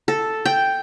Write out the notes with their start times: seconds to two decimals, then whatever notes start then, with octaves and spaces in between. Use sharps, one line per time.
0.08 A4
0.45 G5